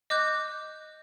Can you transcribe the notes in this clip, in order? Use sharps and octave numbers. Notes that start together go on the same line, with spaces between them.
D#5 D6 F#6 G6